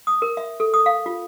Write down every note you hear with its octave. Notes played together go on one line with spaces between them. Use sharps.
D#6
A#4
E5
A4
D#6
F5
F4